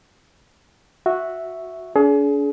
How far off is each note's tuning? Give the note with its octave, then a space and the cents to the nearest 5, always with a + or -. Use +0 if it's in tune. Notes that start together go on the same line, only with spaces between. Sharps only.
F#4 -5 E5 +0
D4 -45 G#4 +30